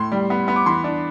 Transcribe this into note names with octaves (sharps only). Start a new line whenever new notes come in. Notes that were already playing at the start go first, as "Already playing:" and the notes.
Already playing: A2 C6
G3
B3
B3
D6
E3 C6
D4